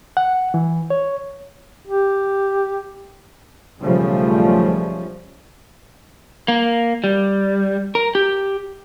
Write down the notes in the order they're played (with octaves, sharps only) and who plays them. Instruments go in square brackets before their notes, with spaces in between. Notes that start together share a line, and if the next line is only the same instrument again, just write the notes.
[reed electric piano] F#5
E3
C#5
[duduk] G4
[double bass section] B1 C#3 F3 G3 A3 C#4
[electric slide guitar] A#3
G3
A#4
G4